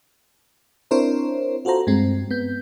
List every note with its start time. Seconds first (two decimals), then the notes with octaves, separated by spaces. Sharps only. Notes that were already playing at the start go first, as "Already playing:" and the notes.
0.91 C4 D4 E4 A#4 C5 C#5
1.65 F4 F#4 A4 C5 A#5
1.87 G2 G#3 C4
2.31 B3 G6